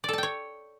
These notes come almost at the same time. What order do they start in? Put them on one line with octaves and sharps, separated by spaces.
D5 A4 A5 G5 C#5